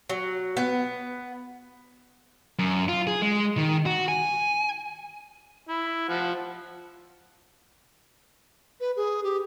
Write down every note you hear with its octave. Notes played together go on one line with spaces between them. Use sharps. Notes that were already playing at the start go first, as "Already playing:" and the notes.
F#3
B3
F#2
F4
G#4
G#3
D#3
F#4
G#5
E4
F3 F#5
B4
G#4
G4